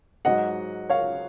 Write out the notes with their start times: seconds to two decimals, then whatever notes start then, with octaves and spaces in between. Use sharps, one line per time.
0.25 G#2 F#3 D#5 F#5
0.90 C#5 F5